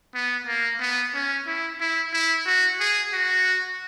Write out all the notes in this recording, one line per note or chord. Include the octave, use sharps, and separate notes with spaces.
B3
A#3
B3
C#4
E4
E4
E4
F#4
G#4
F#4